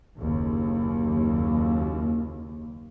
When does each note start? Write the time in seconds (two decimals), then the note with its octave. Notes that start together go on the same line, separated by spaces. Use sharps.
0.20 F#1 D#2